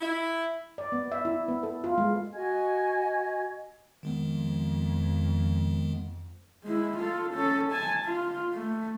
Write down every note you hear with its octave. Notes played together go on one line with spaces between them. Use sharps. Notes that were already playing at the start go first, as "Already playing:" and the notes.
E4
D5
B3
E5
E4
B3
A4
F4
G#3
F#4 D#5 G#5 G#6
F2 D#3 G#3 B3
G#3 E4
F4 A4
C#4 A4
G#5 A5
F4
A3